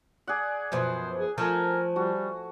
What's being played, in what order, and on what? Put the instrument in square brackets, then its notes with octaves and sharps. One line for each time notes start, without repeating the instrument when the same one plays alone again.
[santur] G#4 D5 F#5
[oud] F#2 B2 F3 [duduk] C5
[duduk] G#4
[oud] F3 [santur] A3 G#5 [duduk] A#4
[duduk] G3 [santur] F#4